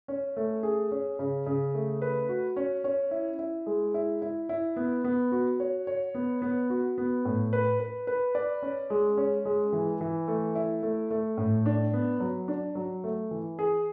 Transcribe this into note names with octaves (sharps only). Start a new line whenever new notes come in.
C#4
A3
G#4
C#4
C#3
C#3
A3
B4
F#4
C#4
C#4
E4
E4
G#3
E4
E4
E4
B3
B3
F#4
C#5
C#5
B3
B3
F#4
B3
A2
B4
B4
B4
D5
C#4
G#3
C#4
G#3
E3
E3
A3
E4
A3
A3
A2
D4
B3
F#3
D4
F#3
A3
E3
G#4